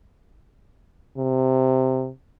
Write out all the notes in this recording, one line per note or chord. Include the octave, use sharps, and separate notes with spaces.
C3